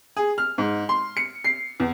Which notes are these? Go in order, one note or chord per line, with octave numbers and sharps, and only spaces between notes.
G#4
F6
G#2
C6
C#7
C7
E2